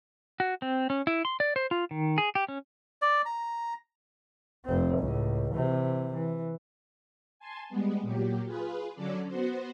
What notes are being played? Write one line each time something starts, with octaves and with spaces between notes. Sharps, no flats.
F#4
C4
C#4
E4
C6
D5
C5
F4
D#3
G#4
G4
C#4
D5
A#5
F1 C4
C#2 A2
C3 E3
E3
G#5 A5 C6
G3 G#3 B3
A#2 F#3 G4
F4 G#4 B4
D3 F#3 C#4 A4 D5
B3 F#4 C5